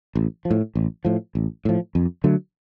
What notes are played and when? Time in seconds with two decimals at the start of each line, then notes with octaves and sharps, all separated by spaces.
0.15 A1
0.45 F3
0.51 A2
0.75 A1
1.05 A2 F3
1.35 A1
1.65 A2 F3
1.95 F2
2.24 D3 F#3 A3